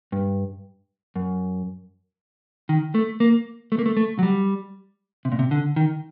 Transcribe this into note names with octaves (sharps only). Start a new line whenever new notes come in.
G2
F#2
D#3
A3
A#3
A3
A#3
A3
A3
F#3
G3
C3
A#2
C3
D3
D#3